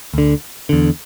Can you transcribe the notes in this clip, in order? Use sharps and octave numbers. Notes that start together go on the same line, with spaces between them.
D2 D3
E2 D3